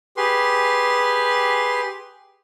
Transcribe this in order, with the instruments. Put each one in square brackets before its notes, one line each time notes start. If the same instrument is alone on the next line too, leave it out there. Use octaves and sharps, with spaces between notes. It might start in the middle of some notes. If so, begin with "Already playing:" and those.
[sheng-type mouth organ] G4 G#4 B4 C6